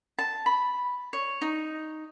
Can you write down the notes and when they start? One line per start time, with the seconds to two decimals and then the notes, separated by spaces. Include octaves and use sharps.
0.18 A5
0.46 B5
1.13 C#5
1.41 D#4